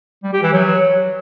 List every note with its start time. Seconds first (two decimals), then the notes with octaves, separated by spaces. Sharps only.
0.24 G3
0.33 G4
0.43 E3
0.52 F#3